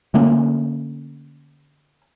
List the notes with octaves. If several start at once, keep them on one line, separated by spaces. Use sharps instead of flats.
D3 A3 A#3 C#4